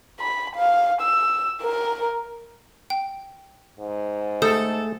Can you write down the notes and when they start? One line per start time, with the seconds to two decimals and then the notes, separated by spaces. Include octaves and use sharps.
0.19 B5
0.56 F5
1.02 E6
1.63 A#4
2.90 G5
3.79 G#2
4.42 A3 G#4 A4 D#6 G6